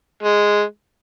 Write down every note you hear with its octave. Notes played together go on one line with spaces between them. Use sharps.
G#3